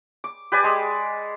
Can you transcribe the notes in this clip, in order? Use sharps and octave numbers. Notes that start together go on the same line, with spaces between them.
D6
G4 B4 D5 G#5
G#3